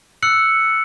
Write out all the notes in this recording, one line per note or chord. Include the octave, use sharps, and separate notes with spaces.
E6 F#6 C#7 F#7